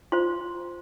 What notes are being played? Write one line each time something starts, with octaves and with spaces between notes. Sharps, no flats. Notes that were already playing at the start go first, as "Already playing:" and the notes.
F4 C5 C6